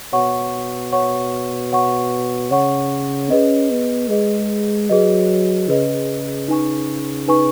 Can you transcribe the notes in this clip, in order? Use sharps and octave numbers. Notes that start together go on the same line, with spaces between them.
B2 C#5 F#5 C#6
C#5 F#5 C#6
C#5 F#5 C#6
C#3 C#5 F#5 C#6
C#4 G#4 B4 D#5
B3
G#3 G#4 B4 D#5
F#3 G#4 B4 D#5
C#3 G#4 B4 D#5
D#4 B4 G#5 C#6
D#4 B4 G#5 C#6